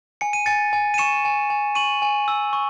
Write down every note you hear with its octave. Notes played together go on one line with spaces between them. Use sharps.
G#5 C#7
D#7
G#5 A6 C#7
G#5
D#7
C#6 C#7 E7
G#5
G#5
C#6 D#7 F#7
G#5
E6
C#6